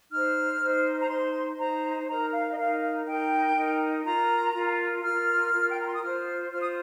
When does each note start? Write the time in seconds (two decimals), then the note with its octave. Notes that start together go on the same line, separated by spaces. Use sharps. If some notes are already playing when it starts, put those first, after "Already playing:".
0.11 D#4 C5 F6
0.60 D#4 C5
1.01 A#5
1.09 D#4 C5 C6
1.58 D#4 C5 A#5
2.08 D#4 A#4 A#5
2.32 F5
2.52 D#5
2.57 D#4 A#4 F5
3.06 D#4 A#4 G5
3.57 D#4 A#4
4.05 F4 A#4 A#5
4.54 F4 A#4
5.04 F4 A#4 F6
5.54 F4 A#4
5.71 G5
5.79 A#5
5.88 C6
5.95 D#6
6.02 F4 C5 F6
6.51 F4 C5 F6
6.60 D#6